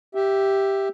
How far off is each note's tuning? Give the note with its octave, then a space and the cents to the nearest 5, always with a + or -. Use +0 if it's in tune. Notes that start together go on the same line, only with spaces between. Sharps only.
G4 +0 E5 +0